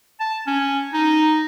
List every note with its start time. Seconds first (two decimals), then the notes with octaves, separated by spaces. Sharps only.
0.20 A5
0.47 C#4
0.93 D#4